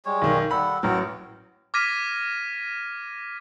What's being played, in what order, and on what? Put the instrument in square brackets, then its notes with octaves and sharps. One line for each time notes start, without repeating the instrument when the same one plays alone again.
[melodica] G3 G#3 C#5
[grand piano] B1 D#3
[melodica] G3 A4 F#5 [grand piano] B5
[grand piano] A1 F#3 [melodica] F#4 A#4 G5
[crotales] D6 F6 G#6 A#6 B6 D#7